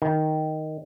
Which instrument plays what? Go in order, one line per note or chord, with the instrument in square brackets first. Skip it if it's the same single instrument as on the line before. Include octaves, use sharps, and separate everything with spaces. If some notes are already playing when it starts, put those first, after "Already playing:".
[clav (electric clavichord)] D#3